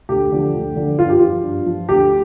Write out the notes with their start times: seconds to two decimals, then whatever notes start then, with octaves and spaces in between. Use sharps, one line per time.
0.09 D2 G4
0.32 D3 F3
0.54 D2
0.76 D3 F3
0.99 G2 F4
1.09 G4
1.19 F3 F4
1.43 G2
1.66 F3
1.89 D2 G4